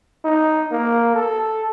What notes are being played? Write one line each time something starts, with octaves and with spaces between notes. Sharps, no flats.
D#4
A#3
A4